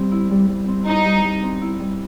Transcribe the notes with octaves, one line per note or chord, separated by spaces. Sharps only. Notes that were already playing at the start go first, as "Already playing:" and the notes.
Already playing: G3 C4
E4
G3
G3
C4
D#4 E4
G3
G3
C4
E4
G3